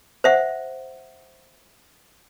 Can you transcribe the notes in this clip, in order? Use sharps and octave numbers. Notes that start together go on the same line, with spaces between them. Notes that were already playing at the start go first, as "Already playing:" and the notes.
C5 E5 F#5